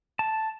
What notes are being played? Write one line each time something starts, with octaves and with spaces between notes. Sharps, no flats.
A5